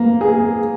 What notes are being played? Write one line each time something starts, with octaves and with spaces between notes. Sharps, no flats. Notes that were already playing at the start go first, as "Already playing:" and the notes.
Already playing: A#3
G#4